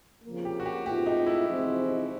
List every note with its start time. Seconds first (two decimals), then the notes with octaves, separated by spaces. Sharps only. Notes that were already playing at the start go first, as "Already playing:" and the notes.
0.24 F2 C#3 F3 A#3
0.45 G4
0.60 F#4
0.66 G4
0.86 G#2 E3 A3 C4 F4 G4
1.06 D#4
1.26 E4
1.47 E2 C3 F3 G#3 C4